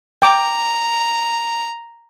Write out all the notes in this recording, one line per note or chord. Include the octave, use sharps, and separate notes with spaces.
G5 A#5 D6